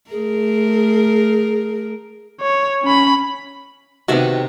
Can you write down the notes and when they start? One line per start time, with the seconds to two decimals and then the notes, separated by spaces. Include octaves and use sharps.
0.11 A3 G#4 A#4
2.41 C#5
2.83 C#4 B5
4.08 C3 D#3 B3 F#4 E5